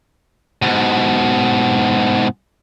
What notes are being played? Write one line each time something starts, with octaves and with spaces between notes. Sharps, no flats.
G#2 B2